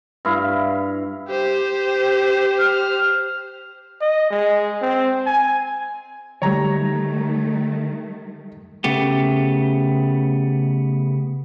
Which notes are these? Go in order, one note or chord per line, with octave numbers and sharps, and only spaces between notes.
G2 E4 F5
G4 C5
F6
D#5
G#3
C4
G#5
D3 D#3 F#3 G3 A3 C#5 A#5
C#3 A3 B3 G4